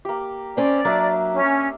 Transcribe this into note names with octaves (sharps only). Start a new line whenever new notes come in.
A#3 G4
C4 C#4 D5
F#3 A#3 D4 E5
C#4